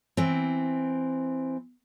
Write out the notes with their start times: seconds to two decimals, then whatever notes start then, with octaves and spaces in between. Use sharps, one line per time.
0.17 E3 C4